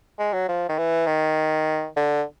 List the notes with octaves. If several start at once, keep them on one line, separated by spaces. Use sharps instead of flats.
G#3
F#3
F3
D#3
E3
D#3
D3